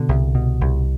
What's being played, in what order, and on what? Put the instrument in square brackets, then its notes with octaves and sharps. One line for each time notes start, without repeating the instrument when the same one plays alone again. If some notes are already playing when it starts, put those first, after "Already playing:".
Already playing: [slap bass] B2 D3
C2
B2
C2